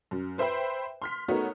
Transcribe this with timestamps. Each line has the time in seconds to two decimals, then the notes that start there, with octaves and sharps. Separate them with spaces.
0.11 F#2
0.38 B4 C5 E5 G5 B5
1.02 C6 F6 B6
1.28 A3 B3 D#4 F#4 A#4 C#5